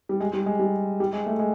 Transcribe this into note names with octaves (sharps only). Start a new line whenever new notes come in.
G3
G#3
G3
G#3
G3
G3
G#3
A3
G#3